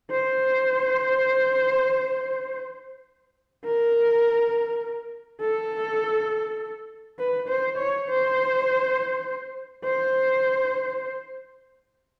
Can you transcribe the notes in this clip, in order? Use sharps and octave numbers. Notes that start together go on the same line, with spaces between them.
C5
A#4
A4
B4
C5
C#5
C5
C5